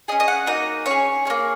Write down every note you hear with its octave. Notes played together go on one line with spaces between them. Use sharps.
C#4 G#4 D#5
D#5
F#5
A#3 D#4 F#4 D#5
C#4 G#4 C#5
A#3 C#4 G#4